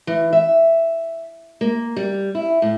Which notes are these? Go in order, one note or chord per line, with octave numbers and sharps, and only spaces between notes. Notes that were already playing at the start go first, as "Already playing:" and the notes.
E3
E5
A#3
G3
E4
A2